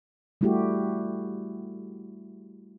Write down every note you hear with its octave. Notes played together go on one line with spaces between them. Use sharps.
G3 A3 E4 F#4 G4